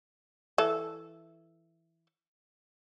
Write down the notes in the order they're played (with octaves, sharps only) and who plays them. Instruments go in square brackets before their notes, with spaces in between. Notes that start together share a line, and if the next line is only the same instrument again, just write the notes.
[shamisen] E3 A4